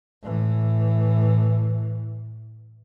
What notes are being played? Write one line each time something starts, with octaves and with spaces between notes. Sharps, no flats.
A2 E3